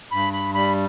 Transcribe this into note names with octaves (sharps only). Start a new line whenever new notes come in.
G2 B5
B5
G3 B5